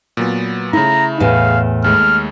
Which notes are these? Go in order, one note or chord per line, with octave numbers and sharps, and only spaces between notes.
A#2 F#3 B3
C#3 A3 E4 A#5
E2 A2 F5 G#5
D#2 G#3 A3 F6